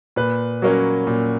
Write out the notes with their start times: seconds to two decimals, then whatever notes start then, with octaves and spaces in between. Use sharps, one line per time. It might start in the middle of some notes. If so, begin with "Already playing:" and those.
0.16 A#2 B4
0.62 F#3 A#3 C#4
1.07 A#2